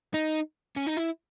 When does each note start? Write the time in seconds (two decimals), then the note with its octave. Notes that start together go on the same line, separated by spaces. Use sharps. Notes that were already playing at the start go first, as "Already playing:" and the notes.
0.14 D#4
0.77 C#4
0.87 D#4
0.97 E4